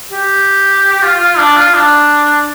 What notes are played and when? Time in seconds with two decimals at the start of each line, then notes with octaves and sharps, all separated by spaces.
0.11 G4
1.02 F4
1.20 F4
1.38 D4
1.56 F4
1.75 D4